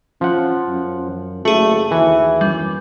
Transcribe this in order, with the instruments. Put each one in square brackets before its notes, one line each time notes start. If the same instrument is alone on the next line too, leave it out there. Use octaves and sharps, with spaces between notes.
[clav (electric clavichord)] F3 F#5 [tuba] C#4
[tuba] F#2
[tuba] F#1 [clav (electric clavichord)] A3 [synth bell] F#4 G#4
[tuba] D#2 [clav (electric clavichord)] E3
[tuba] F#2 [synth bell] G3